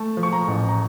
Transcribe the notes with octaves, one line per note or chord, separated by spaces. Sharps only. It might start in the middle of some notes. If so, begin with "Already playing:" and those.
Already playing: A3 A5
F3
C#6
A#5
A1
A#5